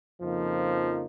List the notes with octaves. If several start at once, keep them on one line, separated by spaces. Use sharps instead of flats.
F2 C#3 F3 A#3 D#4